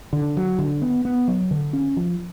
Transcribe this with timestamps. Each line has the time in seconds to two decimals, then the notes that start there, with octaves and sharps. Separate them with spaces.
0.13 D3
0.37 F#3
0.58 D3
0.82 B3
1.05 B3
1.28 F#3
1.51 D3
1.73 C#4
1.97 F3